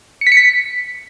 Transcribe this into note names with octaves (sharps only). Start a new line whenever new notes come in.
C#7
B6
C#7
B6